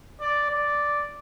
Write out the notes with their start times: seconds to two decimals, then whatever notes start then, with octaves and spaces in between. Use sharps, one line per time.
0.21 D5
0.50 D5